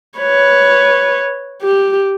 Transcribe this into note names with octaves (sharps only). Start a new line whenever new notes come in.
B4 C#5
G4